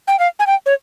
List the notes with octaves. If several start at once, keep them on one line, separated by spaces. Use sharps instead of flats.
G5
F5
G#5
G5
C#5